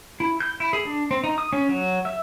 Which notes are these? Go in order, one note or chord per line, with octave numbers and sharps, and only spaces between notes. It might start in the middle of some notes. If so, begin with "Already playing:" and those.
E4
G6
E4
G#4
D4
C4
D#4
D#6
C#4
F#3
E5